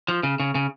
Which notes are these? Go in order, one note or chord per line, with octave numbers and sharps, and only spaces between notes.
F3
C#3
C#3
C#3